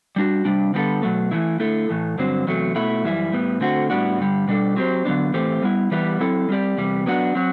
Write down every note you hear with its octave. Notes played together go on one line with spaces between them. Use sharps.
G3 D4 F#4
C3 G3 D4
D3 G3 B3 F#4 A4
B2 F#3 A3
E3 A3 E4
D3 A3 E4 A4
A2 E3 A3
G2 D3 F#3 C4
E2 C3 F#3 A3
B2 A3 E4
F#2 E3 G3 E4
A2 G3 B3
D3 A3 C4 F#4
A2 G3 B3 D4 F#4
G2 D3 G3
B2 G3 D4 A4
F#3 C4 G4 C5
D3 F#3 B3 D4
A2 E3 A3 C4 G4
G3 B3 E4
E3 G3 B3 E4 G4
F#3 C4 E4 A4
G3 C4 G4 D5
E2 C3 G3
F#3 B3 D4 F#4
F#3 C4 F#4